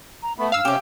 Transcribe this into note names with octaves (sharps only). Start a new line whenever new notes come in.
A#5
A3 B3 B5
G2 F5 E6 F6
C3 C#4 G4 D6